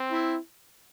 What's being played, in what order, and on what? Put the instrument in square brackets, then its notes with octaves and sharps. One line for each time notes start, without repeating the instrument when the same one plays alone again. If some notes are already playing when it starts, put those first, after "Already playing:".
Already playing: [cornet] C4
[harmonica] E4